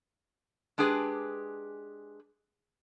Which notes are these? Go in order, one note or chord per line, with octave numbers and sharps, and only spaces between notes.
G#3 D4 G4 G#4 B4